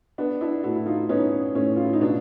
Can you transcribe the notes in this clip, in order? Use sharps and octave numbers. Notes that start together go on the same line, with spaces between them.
B3 D4
D4 E4
A2 E4 F#4
E4
D#4 F4
B3 C#4 D#4
A2 C#4
F4
E4
D#4
B2 D4